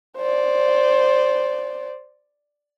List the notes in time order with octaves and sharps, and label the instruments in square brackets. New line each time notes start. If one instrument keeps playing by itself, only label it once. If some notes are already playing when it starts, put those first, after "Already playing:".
[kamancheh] C5 D5